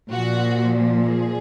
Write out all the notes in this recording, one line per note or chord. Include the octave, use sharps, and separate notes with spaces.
A#2 F3 F#4
G#4